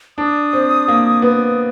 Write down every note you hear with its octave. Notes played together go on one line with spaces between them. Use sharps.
D4 D#6
C4
A#3
B3